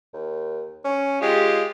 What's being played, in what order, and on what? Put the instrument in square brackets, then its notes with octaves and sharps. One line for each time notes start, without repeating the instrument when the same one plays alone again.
[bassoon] D#2
C#4
[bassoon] G#3 [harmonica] F4 G4